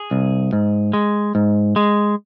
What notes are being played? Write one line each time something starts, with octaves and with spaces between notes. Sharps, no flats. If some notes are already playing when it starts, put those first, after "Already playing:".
Already playing: G#4
C2
G#2
G#3
G#2
G#3